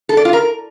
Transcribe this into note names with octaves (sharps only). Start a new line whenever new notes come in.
A4
D5
F4
A#4